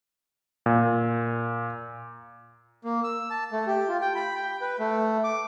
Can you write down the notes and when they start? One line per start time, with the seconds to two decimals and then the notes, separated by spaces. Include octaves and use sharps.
0.66 A#2
2.83 A#3
3.04 E6
3.30 A5
3.52 A3
3.67 G4
3.89 F4
4.01 G5
4.15 B5
4.35 G5
4.61 B4
4.80 A3
5.24 D6